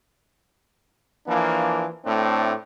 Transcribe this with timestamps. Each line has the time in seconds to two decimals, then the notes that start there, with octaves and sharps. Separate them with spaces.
1.27 E3 F3 A#3 D4
2.04 A2 A3 C4 D4